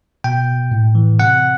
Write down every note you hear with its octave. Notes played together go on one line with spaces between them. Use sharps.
B2 G5
A2
E3
C3 F#5